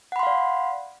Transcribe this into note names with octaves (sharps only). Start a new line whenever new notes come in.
D5 F5 F#5 B5 C6